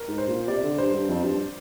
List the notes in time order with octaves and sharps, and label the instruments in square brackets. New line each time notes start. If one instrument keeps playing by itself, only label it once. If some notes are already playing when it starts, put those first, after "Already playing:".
Already playing: [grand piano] A#4
[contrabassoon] G#2
[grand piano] C5
[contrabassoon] A#2
[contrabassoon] C3 [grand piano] D5
[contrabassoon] D3
[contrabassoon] G2 [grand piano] C5
[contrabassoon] G2
F2
G2